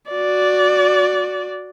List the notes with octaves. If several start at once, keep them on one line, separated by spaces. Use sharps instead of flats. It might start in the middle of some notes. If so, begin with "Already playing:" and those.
F#4 D5